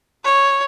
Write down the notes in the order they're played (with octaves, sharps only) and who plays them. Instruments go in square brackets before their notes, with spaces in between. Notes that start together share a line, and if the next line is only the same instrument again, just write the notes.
[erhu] C#5